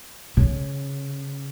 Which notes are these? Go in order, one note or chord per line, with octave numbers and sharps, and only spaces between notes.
C#3